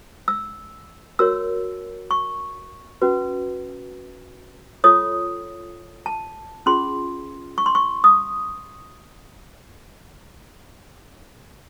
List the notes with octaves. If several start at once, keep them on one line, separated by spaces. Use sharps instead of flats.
E6
F#4 A#4 C#5 E6
C#6
C#4 F#4 B4
F4 A4 C#5 D#6
A5
C#4 F4 G#4 C6
C#6
C6
C#6
D#6